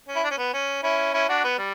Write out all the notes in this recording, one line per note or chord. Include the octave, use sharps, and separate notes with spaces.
C#4
E4
D4
C#4
B3
C#4
C#4 E4
C#4 E4
D4 F#4
B3
G3